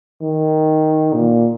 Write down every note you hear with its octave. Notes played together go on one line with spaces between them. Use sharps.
D#3
A#2